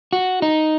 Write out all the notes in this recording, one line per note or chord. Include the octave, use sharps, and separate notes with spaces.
F#4
D#4